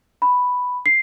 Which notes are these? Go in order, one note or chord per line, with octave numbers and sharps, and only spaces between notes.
B5
C7